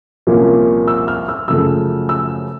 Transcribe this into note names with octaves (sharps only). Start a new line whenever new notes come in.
C2 A#2 F3 A#3 C#4
E6
F6
E6
F#2 C#3 F3 A3 E6
E6